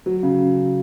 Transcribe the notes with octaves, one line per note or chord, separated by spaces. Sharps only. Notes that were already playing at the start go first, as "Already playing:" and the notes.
F#3
C#3